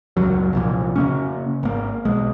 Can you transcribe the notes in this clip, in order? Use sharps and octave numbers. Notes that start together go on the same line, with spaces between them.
D#1 C#2 F#2 F#3
C2 F2 A#2
C#3 A#3 C#4
G#1 A#3
B1 G#3